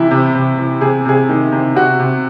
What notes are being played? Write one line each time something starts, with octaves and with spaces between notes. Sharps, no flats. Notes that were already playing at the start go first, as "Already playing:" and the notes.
Already playing: C3 E3 E4
C3
C3
E3
C3 G#4
C3 G#4
D#3
C3
C3 F#4
C3